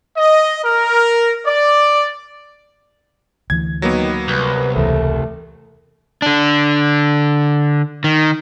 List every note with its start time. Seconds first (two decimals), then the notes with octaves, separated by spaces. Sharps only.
0.17 D#5
0.65 A#4
1.46 D5
3.50 D2 E3 G#6
3.82 D#3 F#3 A#3 B3
4.28 C2 B4
4.75 E1 C#2 E3 A3
6.22 D3 D4
8.04 D#3